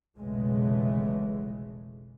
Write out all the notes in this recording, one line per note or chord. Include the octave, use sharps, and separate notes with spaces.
F1 B1 C#3 E3 G#3 A3